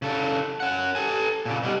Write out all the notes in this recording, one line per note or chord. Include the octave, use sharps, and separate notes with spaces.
C#3 A4
C#4 F#5
A4 G#5
A#2 C#3
B2 G3